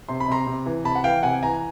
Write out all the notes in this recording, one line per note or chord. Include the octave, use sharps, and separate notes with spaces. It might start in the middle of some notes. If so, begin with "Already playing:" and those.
C3 C6
B5
C3 A#5 C6
C3
E3
C3 A5 B5
F#5
E3 F5 G5
C3 F#5 G#5
E3 G#5 A#5